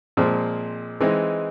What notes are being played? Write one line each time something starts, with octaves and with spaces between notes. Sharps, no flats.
A#2 F3 G#3 C4
E3 G#3 C4 D#4